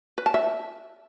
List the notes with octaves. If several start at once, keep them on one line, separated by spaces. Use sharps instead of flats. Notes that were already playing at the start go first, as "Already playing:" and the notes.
B4
A5
E5